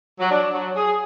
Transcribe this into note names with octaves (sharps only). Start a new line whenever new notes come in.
F#3
D4
F#3
G#4